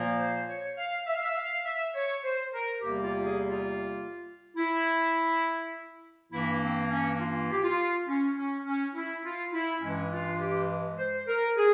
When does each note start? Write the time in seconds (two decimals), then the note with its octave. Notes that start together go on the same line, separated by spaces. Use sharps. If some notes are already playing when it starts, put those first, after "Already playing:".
Already playing: A#2 F3 A#3
0.19 C5
0.48 C#5
0.77 F5
1.07 E5
1.14 F5
1.21 E5
1.36 F5
1.65 E5
1.94 C#5
2.23 C5
2.53 A#4
2.81 E2 C3 G3 A#3 G4
3.04 F4
3.25 G#4
3.48 F4
4.57 E4
6.32 G2 E3 A#3 E4
6.61 C4
6.90 C#4
7.20 F4
7.51 G4
7.63 F4
8.07 C#4
8.36 C#4
8.65 C#4
8.94 E4
9.24 F4
9.53 E4
9.81 G2 E3 G#3 C#4
10.11 F4
10.40 G4
10.99 C5
11.28 A#4
11.57 G#4